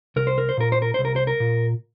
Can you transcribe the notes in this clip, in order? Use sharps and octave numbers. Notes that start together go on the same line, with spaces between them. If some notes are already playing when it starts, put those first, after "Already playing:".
C2 A#4
C5
A#4
C5
A#2 A#4
C5
A#4
C2 C5
A#4
C5
A#4
A#2